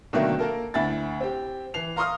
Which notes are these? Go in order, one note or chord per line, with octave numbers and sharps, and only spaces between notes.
B2 D3 D#3 F#3 A3 A#3
A#3 A4 A#4
D2 E4 B5 A6
C4 G4
E3 C7 F7
F5 A#5 C6 C#6 D#6 F6